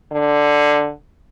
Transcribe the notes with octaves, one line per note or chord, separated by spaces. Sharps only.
D3